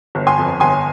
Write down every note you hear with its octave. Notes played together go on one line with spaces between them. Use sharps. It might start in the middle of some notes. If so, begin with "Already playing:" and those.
G1
G#5 C6
F2
G1 G#5 C6